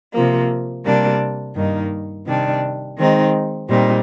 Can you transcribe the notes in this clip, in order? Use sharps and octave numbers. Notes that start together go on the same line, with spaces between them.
C3 F3 A#3
C3 G3 A#3 D4
G2 D#3 A#3 D#4
C3 D#3 G3 D4
D#3 G#3 C4 D#4
A#2 G3 C4 D#4